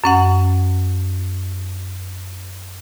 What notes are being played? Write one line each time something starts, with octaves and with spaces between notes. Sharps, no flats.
F#2 C#4 F#5